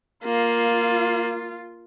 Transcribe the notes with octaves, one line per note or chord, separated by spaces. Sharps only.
A#3 F4